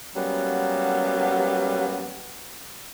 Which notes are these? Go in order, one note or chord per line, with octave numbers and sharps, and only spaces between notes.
F#3 G3 A#3 B3 C#4